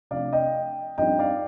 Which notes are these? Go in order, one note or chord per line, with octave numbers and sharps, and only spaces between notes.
C3 F3 A3 D4 D5 F5
D#5 G5
G2 F3 C4 D#4 D#5 G5
D5 F5